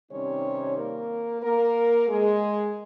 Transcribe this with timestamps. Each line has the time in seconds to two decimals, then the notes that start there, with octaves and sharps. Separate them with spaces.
0.11 C3 D#3 G3 C4 C#4 D#4 C#5
0.77 A#3 A#4
1.43 A#3 A#4
2.08 G#3 G#4